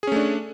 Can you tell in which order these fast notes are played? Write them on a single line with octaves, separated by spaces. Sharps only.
G#4 C#4 A3 D4